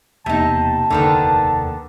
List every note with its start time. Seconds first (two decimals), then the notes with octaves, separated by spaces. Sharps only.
0.26 E1 C3 A#3 B3 D#4 A5
0.90 F1 D#2 D3 D#3 B3